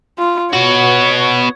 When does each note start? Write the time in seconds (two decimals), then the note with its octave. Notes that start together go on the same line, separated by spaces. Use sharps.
0.18 F4
0.53 B3 F#4 C#5